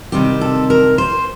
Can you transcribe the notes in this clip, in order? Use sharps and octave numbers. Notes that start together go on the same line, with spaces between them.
C3 D#3 G3 C4 G4
A4
A#4
C5